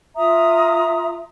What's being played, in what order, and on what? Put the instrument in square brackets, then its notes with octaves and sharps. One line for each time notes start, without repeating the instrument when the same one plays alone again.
[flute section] F4 E5 A#5 D#6